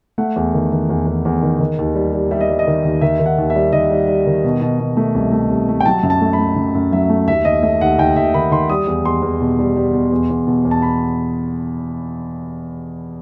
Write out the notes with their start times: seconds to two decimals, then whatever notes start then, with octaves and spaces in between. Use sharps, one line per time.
0.18 A3 F#5
0.36 E2
0.54 D#3
0.72 D#3
0.89 E2
1.06 E2
1.25 E2
1.43 D#3
1.60 D#3
1.78 D#2
1.95 G3
2.13 G3
2.31 G3 E5
2.41 D#5
2.49 G3
2.59 D#5
2.67 D#3
2.84 D#2
3.01 D#3 E5
3.19 D#3
3.26 F#5
3.38 D#2
3.50 E5
3.55 G3
3.72 D#3 D#5
3.91 G3
4.08 G3
4.27 D#3
4.44 B2
4.61 B2
4.80 B2
4.97 A3
5.15 C2
5.32 A3
5.51 C2
5.69 A3
5.80 G5
5.86 F#3 A5
6.03 F#2
6.10 A5
6.21 A3
6.33 B5
6.38 A3
6.56 F#2
6.75 F#2
6.92 F#3 E5
7.10 A3
7.27 D#2 E5
7.45 D#2 D#5
7.62 A3 E5
7.81 D#2 F#5
7.98 D#2 G5
8.16 D#2 E5
8.34 D#3 B5
8.51 D#3 C6
8.70 G3 D#6
8.87 E2
9.05 E2 C6
9.22 E2
9.41 B2
9.59 G3
9.76 G3
9.93 B2
10.12 E2
10.29 E2
10.47 B2
10.65 E2
10.71 A5
10.82 B5